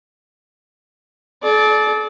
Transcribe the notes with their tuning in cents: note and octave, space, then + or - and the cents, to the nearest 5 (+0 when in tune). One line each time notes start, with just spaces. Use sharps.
A4 -45 D5 +0